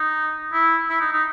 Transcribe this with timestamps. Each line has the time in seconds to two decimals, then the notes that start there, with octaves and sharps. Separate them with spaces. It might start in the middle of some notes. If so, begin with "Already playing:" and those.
Already playing: D#4
0.53 E4
0.89 E4
1.01 D#4
1.13 D#4